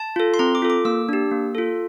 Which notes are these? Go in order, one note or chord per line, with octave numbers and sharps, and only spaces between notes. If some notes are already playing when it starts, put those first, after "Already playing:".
Already playing: A5
F4 A4
C6
C4 A#5
D6
F4 A4
D6
A#3 E6
D4 G4
A#3
F4 A4